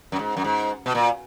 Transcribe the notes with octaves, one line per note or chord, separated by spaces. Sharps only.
F#2
G#2
F#2
G#2
B2
A#2